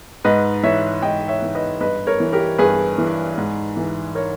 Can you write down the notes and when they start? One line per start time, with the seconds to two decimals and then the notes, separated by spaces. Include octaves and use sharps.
0.24 G#2 B4 D#5
0.63 E3 C#5 E5
1.02 G#2 D#5 G5
1.28 C#5 E5
1.42 E3
1.55 B4 D#5
1.80 G2 B4 D#5
2.07 A#4 C#5
2.20 E3
2.33 G4 A#4
2.58 G2 G#4 B4
2.98 E3
3.37 G#2
3.77 E3
4.15 A#4 C#5